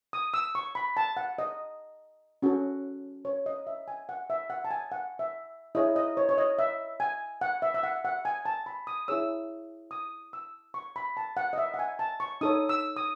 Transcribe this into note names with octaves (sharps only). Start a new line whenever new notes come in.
D#6
E6
C#6
B5
A5
F#5
D#5
C#4 F#4 A4
C#5
D#5
E5
G#5
F#5
E5
F#5
A5
G#5
F#5
E5
E4 G#4 C#5 D#5
D#5
C#5
C#5
D#5
E5
G#5
F#5
E5
E5
F#5
F#5
G#5
A5
B5
D#6
E4 G#4 C#5 E6
D#6
E6
C#6
B5
A5
F#5
D#5
E5
F#5
G#5
A5
C#6
D#4 A4 C#5 D#6
E6
D#6